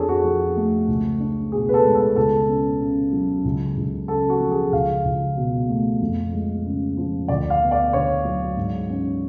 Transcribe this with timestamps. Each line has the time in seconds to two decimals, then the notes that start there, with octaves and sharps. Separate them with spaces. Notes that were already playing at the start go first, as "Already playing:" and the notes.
Already playing: F2 D4 G#4 A4 C#5
0.09 F#4
0.24 F3
0.57 A3
0.88 C#2
1.20 D4
1.52 B2 G#4
1.69 B4
1.74 A4
1.85 G#3
1.95 A4
2.16 C#2 A4
2.49 C#4
2.81 C#3
3.13 F#3
3.45 C#2
3.77 C#2
4.08 C#3 A4
4.30 F#4
4.40 F3
4.52 G#4
4.72 C#2 F5
5.05 C#2
5.37 B2
5.69 A3
6.01 F2
6.33 G#3
6.65 C#3
6.97 F3
7.28 D2 D5
7.50 F5
7.61 B3
7.71 D5
7.93 D3 C#5
8.25 F#3
8.57 G#2
8.90 C#4